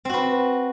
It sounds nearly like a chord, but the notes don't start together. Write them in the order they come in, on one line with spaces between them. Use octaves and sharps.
C4 F#4 B4